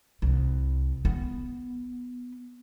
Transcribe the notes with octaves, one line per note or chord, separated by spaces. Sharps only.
C2
B3